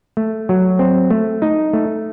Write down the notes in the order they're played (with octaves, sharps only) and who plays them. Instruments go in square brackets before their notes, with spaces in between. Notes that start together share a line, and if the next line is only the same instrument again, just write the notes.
[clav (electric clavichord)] A3
F#3
C4
A3
D#4
A3